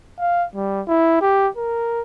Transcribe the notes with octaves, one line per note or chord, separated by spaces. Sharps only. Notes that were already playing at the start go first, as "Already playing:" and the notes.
F5
G3
E4
G4
A#4